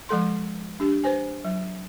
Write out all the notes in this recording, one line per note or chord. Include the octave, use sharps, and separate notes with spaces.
F3 G#3 A4 C6
D4 G4
B4 C5 G#5
F#3